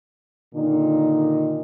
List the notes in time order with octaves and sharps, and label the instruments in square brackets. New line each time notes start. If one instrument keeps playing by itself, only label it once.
[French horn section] A#2 D3 D#3 D#4